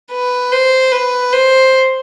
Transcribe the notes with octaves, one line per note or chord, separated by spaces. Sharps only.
B4
C5
B4
C5